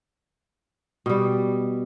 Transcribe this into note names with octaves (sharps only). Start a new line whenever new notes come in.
B2 G3